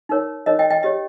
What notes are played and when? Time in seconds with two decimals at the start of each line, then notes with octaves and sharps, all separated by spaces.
0.09 D#4 A#4 C#5
0.46 D#4 A#4 C#5 D#5
0.59 D#5 G5
0.71 D#5 G5
0.83 G4 C#5 D#5